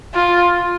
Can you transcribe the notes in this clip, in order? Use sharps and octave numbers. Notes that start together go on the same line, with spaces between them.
F4